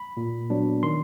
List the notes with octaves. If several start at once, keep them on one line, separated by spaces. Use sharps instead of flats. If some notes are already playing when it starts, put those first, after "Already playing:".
Already playing: B5
A#2
F#3 B3 D4
D#3 C6